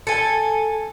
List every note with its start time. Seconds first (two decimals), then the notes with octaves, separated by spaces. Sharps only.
0.07 A4 G#5